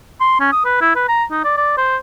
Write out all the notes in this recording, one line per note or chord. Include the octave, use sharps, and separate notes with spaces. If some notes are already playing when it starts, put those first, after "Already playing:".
C6
C#4
D#6
B4
E4
B4
A#5
D#4
D5
D5
C5